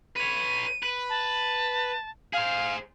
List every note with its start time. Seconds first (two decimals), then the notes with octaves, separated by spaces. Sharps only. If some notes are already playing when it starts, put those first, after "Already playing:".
0.16 B4 C#5 D#7
0.83 B4
1.09 A5
2.33 G#4 C5 F5